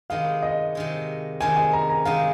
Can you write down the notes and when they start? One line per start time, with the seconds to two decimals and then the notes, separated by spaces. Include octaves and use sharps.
0.10 C3 D#3 G#3 F5
0.42 D#5
0.75 C3 D#3 G#3
1.40 C3 D#3 G#3 G#5
1.56 G#5
1.73 A#5
1.89 A#5
2.05 C3 D#3 G#3 F5